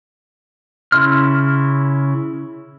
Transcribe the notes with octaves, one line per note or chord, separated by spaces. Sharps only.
C#3 E4 C6 F6